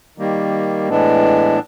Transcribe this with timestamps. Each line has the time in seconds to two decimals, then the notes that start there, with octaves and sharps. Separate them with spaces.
0.18 D#3 G3 A#3
0.89 A2 E3 G#3 B3 D4